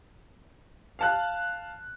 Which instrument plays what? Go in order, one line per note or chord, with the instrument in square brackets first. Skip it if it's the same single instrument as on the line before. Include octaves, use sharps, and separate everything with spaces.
[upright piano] F5 A5 F#6